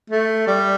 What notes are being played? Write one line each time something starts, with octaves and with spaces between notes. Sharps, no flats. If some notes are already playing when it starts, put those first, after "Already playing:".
A3
G3